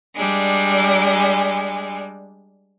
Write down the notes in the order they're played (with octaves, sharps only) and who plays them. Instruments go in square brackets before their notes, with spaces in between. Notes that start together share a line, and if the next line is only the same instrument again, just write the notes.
[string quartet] G3 G#3 D4